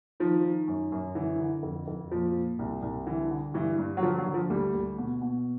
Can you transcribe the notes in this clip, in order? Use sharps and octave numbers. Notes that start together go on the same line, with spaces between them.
D#3 F3
D#3
F#2
F#2
D3 E3
D3
F2
F2
A#2 F3
A#2
C2
C2
D3 E3
D3
G2 E3
G2
F#3
D3 F3
F#3
D3
F3
D2 G3
D2
B2
B2